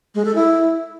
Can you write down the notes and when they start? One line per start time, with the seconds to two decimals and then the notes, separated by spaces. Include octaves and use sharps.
0.15 G#3
0.25 A4
0.35 E4